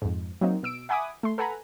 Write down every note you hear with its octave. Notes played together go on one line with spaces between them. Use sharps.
F2 G#2
F#3 A#3 C4 D#4
B2 E6 D7
E5 F#5 G#5 B5 D6 D#6
A3 C6
A4 B4 F#5 G#5 A#5 B5